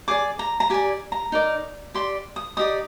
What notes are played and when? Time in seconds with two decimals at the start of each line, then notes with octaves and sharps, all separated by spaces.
0.08 G#4 D5 D6
0.39 A#5
0.60 A#5
0.70 G4 D5 G#5
1.12 A#5
1.32 D#4 A#4 D5
1.94 G4 D5 C6
2.36 D#6
2.57 D#4 G4 D5 D#6